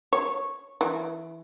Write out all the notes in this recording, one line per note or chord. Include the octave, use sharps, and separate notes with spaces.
C#5
E3